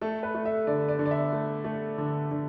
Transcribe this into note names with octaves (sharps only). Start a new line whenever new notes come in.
A3 A4
B4
A3
E5
D3 D5
D5
D3
D5
E5
A3
A3
D3
D3